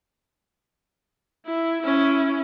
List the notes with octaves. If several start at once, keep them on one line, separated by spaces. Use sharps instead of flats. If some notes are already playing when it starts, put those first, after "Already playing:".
E4
C#4 E4